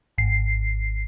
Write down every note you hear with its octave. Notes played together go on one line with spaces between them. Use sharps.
G#1 C7